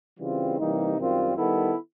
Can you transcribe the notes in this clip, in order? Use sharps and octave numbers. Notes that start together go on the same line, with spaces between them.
C#3 E3 G3 C4 F4
C3 E3 G3 A#3 D#4
F#2 D#3 G3 C4 F4
D#3 G3 B3 E4 A4